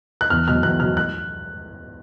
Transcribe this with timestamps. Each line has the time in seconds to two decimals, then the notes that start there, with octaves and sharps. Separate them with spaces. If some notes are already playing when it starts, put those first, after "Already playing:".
0.21 F#6
0.30 E2 F6
0.48 B2 F#3 F6
0.63 E2 F#6
0.80 B2 F#3 F6
0.97 F#6